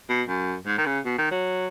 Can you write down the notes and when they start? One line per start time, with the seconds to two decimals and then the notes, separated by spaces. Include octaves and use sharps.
0.09 B2
0.28 F#2
0.67 G#2
0.78 D#3
0.86 C#3
1.05 B2
1.18 D#3
1.31 F#3